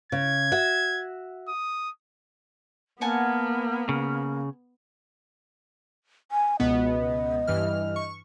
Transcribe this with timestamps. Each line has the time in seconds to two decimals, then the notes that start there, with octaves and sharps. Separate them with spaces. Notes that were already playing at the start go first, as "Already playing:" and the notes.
0.12 C#3 G#6
0.52 F#4 E5
1.48 D#6
3.01 A#3 B3 F#5 G#5 A5
3.89 C#3
6.32 G#5
6.60 C#2 B2 B3 D#5
7.48 G2 E3 F6
7.96 C#6